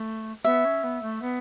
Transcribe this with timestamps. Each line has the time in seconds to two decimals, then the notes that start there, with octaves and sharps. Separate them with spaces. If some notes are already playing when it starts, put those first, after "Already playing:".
Already playing: A3
0.44 B3 E5
0.64 C#4
0.83 B3
1.02 A3
1.21 B3